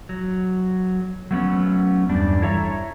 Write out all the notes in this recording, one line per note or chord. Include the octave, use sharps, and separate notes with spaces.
F#3
F#3 A3 B3 C#4
E2 G2 G3 D4
E4 A4 C#5 E5 A#5